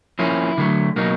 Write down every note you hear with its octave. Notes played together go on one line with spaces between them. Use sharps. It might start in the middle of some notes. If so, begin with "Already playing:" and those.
F3 A#3 C#4 E4
D3 F#3 A3
B2 F#3 A#3 D#4